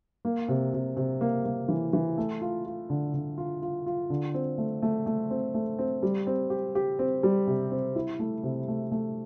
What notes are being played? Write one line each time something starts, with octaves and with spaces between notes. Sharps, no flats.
A#3
C3
C3
C3
A#3
A#3
E3
E3
A3
F4
F4
D3
D3
F4
F4
F4
D3
C4
A3
A3
A3
C4
A3
C4
G3
C4
G4
G4
C4
G3
C3
C4
E4
A3
C3
A3
A3